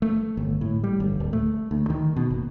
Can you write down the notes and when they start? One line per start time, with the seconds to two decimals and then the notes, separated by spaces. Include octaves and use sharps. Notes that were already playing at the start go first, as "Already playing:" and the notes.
0.02 A3
0.37 G1
0.61 A2
0.83 G3
1.00 G1
1.20 D1
1.33 A3
1.71 D2
1.90 D#3
2.16 B2
2.30 F#1